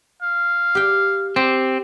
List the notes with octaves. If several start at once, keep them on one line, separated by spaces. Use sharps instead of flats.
F5
G4 G5
C4 G4